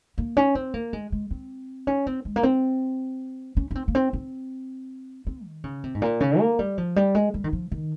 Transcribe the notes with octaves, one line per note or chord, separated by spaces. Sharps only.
A#3
C#4
C4
A#3
G#3
G#3
C4
C#4
C4
G#3
A#3
C4
C#4
C#4
C4
A#3
C4
C4
C4
D#3
C#3
C3
G#2
A#2
C#3
A#3
G3
F3
G3
G#3
G3
D#3
F3
D#3